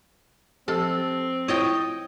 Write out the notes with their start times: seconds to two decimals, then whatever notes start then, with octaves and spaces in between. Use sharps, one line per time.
0.68 F3 C4 G4 A4
1.48 E4 F4 C#5 D#5 G5 A6